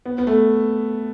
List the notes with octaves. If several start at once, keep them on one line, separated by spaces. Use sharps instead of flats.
B3
B3
A3